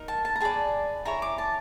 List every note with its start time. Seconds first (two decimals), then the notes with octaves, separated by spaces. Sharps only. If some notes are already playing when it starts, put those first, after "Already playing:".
Already playing: D#4 A#4
0.08 A5
0.25 A5
0.36 A#5
0.40 G#4 B4 D5 A5
1.05 E4 G#4 C#5 A#5
1.22 D6
1.38 A5